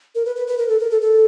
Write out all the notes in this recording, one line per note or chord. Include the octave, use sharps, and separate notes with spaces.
A#4
B4
B4
B4
A#4
A4
A#4
A4
A4